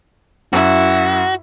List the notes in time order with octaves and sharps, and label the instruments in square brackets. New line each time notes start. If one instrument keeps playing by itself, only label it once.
[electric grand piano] F#2 [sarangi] E4 [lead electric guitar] F#4